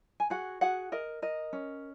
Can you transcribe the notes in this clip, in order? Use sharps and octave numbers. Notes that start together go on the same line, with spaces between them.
G#5
F#4 G#4 F#5
F#4 G#4 F#5
A#4 D#5
A#4 D#5
C#4